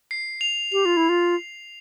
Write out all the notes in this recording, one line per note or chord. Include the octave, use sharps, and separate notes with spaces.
C7
F7
G4 F7
F4
E4
F4